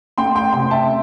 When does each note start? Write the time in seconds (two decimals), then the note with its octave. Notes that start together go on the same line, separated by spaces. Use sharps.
0.18 A3 G5 C6
0.35 G5 C6
0.53 C3 G5 C6
0.71 E5 A5